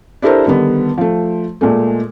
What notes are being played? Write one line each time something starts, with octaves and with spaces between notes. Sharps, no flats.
D4 E4 G4 A4 A#4 C5
D3 D#3 G3 B3
F3 A3
A#2 G#3 A3